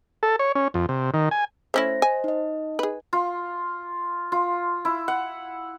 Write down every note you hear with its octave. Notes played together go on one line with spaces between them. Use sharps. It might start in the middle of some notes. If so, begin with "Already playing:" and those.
A4
C#5
C#4
F2
C3
D#3
G#5
A3 C#4 E4 C5 A#6
C5 D#5 G#5
D#4 D#5
G#4 B4
F4
F4
E4
F#5